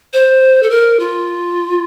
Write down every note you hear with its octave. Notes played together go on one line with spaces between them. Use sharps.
C5
A4
A#4
F4